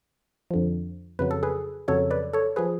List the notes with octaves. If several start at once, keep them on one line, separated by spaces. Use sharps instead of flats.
F2 D3 F3
F2 C#3 F#3 B4
A4
G#4 B4
F2 C#3 F#3 A4 C#5
B4 D5
A4 C#5
F3 G#4 B4